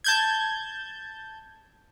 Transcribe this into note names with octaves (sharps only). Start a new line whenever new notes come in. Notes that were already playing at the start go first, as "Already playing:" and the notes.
A5 G6 G#6